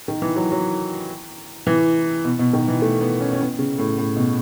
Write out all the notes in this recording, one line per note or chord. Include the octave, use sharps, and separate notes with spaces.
D#3
E3
F#3
F#3
E3
B2
B2
D#3
E3
A3
B3
C#4
C#4
B3
C#3
A2
A2
B2